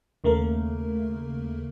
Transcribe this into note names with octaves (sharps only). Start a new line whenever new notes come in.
D#2 C#3 A3 A#3 A#4